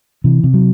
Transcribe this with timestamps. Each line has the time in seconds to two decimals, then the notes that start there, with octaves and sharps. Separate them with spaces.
0.24 C3 E3
0.44 C3
0.54 F#3